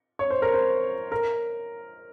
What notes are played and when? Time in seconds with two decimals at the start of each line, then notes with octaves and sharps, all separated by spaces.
0.19 C#5
0.31 C5
0.42 A#4
0.54 C5
1.12 A#4